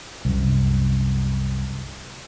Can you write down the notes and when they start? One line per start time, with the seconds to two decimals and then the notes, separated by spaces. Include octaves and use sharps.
0.25 C2 F#2